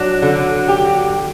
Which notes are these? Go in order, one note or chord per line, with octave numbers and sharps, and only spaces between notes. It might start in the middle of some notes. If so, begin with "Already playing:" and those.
Already playing: F#3 D4 F#4
D3
G4